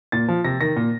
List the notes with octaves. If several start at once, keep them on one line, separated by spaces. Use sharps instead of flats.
A#2 A6
F3
C3 A#6
D#3 A#6
A#2